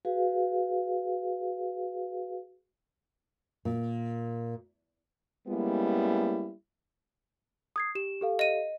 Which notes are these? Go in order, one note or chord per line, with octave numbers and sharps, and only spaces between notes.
F#4 G#4 B4 F5
A#2
G3 G#3 A#3 B3 C#4 E4
D#6 G#6 C7
G4 E7
G4 A4 F5
D#5 D#7